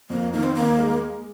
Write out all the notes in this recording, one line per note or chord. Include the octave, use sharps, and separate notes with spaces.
F2 A#3
D#3 A#3
C4
D#2 A#3
G#3